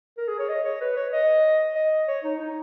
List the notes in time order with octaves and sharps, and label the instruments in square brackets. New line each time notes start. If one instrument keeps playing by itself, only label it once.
[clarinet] A#4
G#4
C#5
D#5
C#5
B4
C#5
D#5
D#5
C#5
D#4
D#4